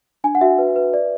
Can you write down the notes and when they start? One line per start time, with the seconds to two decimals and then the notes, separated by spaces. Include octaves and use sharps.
0.24 D4 G#5
0.35 F#5
0.41 F#4 E5
0.58 B4
0.76 B4
0.94 D5